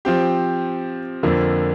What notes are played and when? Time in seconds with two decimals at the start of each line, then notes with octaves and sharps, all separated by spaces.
0.05 F3 C4 G4
1.23 F2 D3 F3 A#3